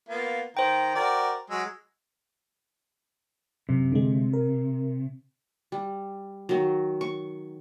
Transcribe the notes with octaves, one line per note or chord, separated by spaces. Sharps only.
A#3 B3 F4
D#3 C5 G5 A#5
F#4 A#4 D5
F#3 G#3 E6
F#2 C3
D3 G#3
A#4
G3
D#3 F#3
C#6